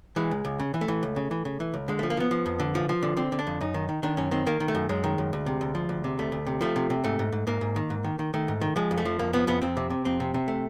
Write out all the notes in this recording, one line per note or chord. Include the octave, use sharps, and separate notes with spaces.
E3 G#3
C#2
C#2
C#3
E3
A3
E3
C#2
C#3
E3
C#3
E3
C#2
D3 G#3
F3 A3
A#3
F3 B3
F3
F2
D3
F3
F3
D3
D3 C4
D3
D4
F2
F#2 D#4
D#3
D#3
D#3 D4
F#2 C#4
D#3 C4
D#3 A#3
D#3
A3
F#2
F#2 G#3
D#3
F#2
D2
C3
D2
F3
D2
C3
D2 A3
D2
C3
F3 A3
C3
C3
G#2 A3
G#2
G#2
G#2 A#3
G#2
D#3
G#2
D#3
D#3
D#3 A3
G#2
D#3
F3 G#3
F2
A3
F3
F2 A#3
F3 B3
F2 B3
F2 C4
C3
C3
F2 C4
C3
C3
A3